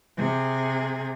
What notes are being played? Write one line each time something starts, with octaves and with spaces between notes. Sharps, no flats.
C3 G#4